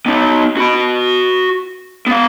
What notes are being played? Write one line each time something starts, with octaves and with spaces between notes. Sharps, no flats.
B3 D#4
F#4 B5
B3 F5